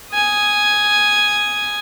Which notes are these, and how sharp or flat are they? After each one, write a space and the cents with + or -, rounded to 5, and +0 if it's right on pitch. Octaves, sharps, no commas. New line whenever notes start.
G#5 +0 D#6 +0